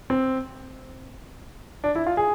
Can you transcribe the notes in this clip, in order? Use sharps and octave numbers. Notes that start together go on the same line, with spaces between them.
C4
D4
E4
F4
G#4